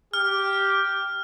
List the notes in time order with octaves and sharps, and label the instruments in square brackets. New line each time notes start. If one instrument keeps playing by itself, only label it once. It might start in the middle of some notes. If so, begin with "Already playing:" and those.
[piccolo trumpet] G4 [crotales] F6